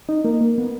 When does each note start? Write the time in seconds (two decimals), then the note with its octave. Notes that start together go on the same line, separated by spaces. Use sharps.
0.09 D#4
0.24 A#3
0.41 A#3
0.58 B3